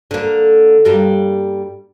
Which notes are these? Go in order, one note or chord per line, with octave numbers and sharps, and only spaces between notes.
D3 A#3
G2 G3 A#3